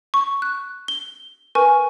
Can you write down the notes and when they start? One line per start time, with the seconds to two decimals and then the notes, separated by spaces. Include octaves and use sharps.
0.14 C#6
0.42 F#6
0.88 G7
1.55 A#4 B4 G#5 C#6